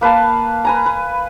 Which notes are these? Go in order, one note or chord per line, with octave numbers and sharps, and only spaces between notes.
A#3 B4 F5 A5
B4 G#5 A#5
B4